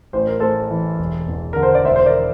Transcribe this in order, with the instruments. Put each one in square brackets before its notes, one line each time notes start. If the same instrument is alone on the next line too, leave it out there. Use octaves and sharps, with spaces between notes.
[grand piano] A1 C5
A#4
A2 A4 C5
E3
E1
E2
D3 A#4
C5
D5
E1 C5 E5
C5
A#4 D5